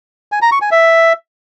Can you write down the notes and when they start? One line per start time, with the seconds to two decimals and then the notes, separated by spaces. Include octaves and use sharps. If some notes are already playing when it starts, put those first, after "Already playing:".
0.32 G#5
0.42 A#5
0.52 C#6
0.62 G#5
0.72 E5